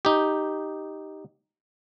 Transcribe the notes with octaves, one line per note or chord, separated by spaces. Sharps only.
D#4 G4